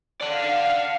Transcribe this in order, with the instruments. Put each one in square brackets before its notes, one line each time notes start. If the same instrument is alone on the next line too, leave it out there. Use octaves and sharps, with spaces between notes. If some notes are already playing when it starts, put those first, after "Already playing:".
[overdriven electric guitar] D5 F#5 [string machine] F5